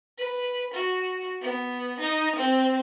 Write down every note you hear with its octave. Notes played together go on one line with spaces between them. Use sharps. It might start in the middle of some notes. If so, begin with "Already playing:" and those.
B4
F#4
B3
D#4
C4